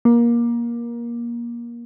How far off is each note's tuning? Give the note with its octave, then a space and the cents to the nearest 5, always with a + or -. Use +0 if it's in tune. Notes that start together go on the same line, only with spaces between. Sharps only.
A#3 +20